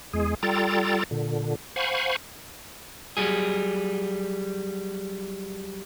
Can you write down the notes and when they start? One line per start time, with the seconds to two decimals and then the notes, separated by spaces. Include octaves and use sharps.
0.13 E2 G#3 G#4
0.43 G3 F4 A4 G5 A#5 A6
1.11 A#2 D3
1.76 C5 F5 F#5 G#5 B5 C#6
3.17 F#3 G3 G#4